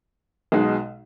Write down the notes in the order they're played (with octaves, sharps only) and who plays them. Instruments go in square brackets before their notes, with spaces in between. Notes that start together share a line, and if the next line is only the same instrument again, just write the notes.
[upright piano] B1 B2 G#3 D#4